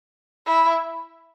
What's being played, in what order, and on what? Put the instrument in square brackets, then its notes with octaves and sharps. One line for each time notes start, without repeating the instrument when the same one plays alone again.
[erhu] E4